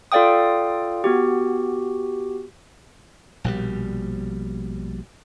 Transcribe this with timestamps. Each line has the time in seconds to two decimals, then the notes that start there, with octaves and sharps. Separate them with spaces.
0.12 F4 A4 D5 F5 G5 D#6
1.04 B3 F#4 G4
3.44 A#1 B2 F3 G3